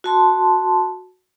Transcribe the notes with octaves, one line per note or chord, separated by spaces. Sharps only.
F#4 A5 C6